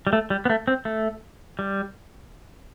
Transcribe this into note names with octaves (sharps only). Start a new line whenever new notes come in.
G3
A3
G3
B3
A3
C4
A3
G3